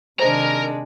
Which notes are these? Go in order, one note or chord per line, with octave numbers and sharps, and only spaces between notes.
C3 D#3 G#3 D4 A#4 C5 A#5